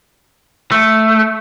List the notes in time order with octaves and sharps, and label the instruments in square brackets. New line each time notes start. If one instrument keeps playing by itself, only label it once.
[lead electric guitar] A3